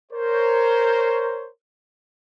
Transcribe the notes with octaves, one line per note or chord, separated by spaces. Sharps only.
A#4 C5 C#5